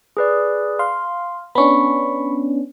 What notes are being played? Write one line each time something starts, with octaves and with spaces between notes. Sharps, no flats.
G#4 B4 D5
F5 C6
B3 C#4 D4 B5 C#6